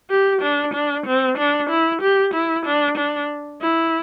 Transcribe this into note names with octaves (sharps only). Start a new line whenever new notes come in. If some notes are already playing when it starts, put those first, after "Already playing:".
G4
D4
D4
C4
D4
E4
G4
E4
D4
D4
E4